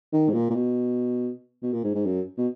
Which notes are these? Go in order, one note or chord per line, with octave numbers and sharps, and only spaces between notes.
D#3
G#2
A#2
A#2
B2
B2
A#2
G#2
G#2
F#2
B2